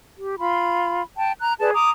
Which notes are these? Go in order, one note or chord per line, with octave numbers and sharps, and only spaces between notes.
G4
F4 B5
G5 A5
A#5 F#6
G#4 B4 D5 A5
A#5 D6 D#6